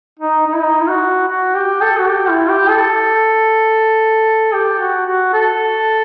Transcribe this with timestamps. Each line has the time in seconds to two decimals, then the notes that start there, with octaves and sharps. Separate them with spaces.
0.19 D#4
0.47 D#4
0.54 E4
0.61 D#4
0.81 E4
0.87 F#4
1.28 F#4
1.55 G4
1.82 A4
1.99 F#4
2.09 G4
2.29 E4
2.50 G4
2.69 A4
4.53 G4
4.79 F#4
5.06 F#4
5.33 A4